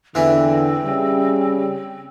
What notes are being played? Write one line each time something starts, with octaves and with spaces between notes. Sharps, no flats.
E2 D3 E3 C4
C#3 G3